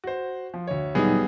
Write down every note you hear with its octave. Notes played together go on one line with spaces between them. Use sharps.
F#4 C5
F3
D2 C#5
A#2 F#3 G3 B3 D#4 G#4